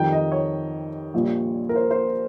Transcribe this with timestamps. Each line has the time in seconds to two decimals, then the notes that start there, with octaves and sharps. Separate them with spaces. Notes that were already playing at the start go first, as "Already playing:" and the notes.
Already playing: F2 D#3 G3 G5
0.12 D#5
0.32 C#5
1.14 A#1 A#2 G3
1.69 A#4
1.75 C5
1.91 C5